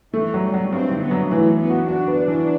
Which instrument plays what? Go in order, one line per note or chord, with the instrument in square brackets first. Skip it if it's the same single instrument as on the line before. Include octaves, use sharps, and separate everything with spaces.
[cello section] E3 [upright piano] A3
[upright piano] F#3
[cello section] G3
[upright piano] F#3
[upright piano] G2 [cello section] C4
[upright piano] D3
[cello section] B3
[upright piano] F#3
[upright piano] E3 [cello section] A3
[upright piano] E3
[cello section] B3
[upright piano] F#4
[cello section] D4 [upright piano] F#4
[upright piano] B3
E3